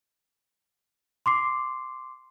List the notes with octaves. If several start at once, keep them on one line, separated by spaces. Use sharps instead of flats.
C6 D6 C7